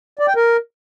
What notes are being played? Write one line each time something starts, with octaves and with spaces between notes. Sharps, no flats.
D5
G5
A#4